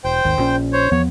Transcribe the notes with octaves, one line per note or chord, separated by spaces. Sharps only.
E1 C5 G5
G#1 D#2
A#1 C#4
C5 C#5
E2 F3 B3 C#5